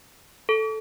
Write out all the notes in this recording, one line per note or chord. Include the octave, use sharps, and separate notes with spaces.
A4